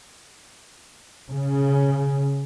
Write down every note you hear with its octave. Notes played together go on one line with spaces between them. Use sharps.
C#3